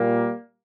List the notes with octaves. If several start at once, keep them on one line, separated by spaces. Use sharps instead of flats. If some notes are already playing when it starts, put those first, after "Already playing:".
Already playing: A#2 G3 A#3